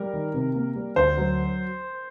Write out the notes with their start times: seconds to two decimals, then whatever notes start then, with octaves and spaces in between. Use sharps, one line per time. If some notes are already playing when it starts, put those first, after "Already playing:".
Already playing: G3 A#4
0.13 D#3
0.34 C3
0.55 A#3
0.75 G3
0.96 D2 C5
1.17 F#3